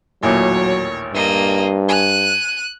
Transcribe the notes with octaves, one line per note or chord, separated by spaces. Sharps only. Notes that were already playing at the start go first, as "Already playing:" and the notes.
A1 D#2 A#2 F#3 C#5
G2 A#3 D#5
G#5 F#6 D#7